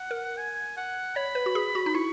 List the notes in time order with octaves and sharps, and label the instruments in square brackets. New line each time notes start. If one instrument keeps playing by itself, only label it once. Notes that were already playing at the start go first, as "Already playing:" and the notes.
Already playing: [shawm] F#5
[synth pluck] A#4
[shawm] G#5
F#5
[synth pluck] C#5 [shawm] B5
[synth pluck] B4
F#4
G#4
F#4
D#4
[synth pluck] E4 [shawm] C#6